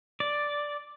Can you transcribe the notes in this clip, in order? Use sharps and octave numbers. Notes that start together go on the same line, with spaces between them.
D5